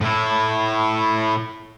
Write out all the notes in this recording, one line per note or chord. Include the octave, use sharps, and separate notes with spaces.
A2 E4